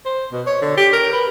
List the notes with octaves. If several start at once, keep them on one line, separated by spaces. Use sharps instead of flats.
C5
B2
C#5
D3
G4
A#4
B4